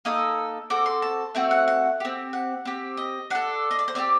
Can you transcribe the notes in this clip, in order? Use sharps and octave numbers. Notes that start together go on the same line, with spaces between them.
A#3 D#4 A4 D#6
C4 F#4 A4 D6
C6
A5
A3 C4 F#4 G5
F#5
F#5
C4 G4
F#5
C4 G4
D#5
D4 A4 F#5
D#5
D5
C5
C4 G4 D5